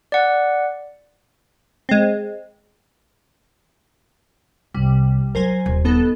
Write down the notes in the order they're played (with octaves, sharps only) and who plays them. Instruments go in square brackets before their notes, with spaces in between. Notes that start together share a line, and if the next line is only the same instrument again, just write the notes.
[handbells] D5 F#5
[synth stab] G#3 C4
[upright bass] C2 [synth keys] G3
[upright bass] F#3 [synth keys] A#4 C5 G#5
[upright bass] D#1
[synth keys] B3 D#4 A4